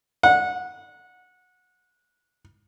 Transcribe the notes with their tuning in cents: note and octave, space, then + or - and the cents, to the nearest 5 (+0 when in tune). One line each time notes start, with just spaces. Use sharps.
F#5 -20